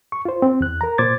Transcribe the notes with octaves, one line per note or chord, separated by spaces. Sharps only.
C#6
F4 C5
C4
E2 F#6
A#4 A#5
A#2 C5 D6 G#6 A6